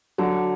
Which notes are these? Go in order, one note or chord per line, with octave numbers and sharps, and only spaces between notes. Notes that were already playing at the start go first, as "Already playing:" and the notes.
D3 F#3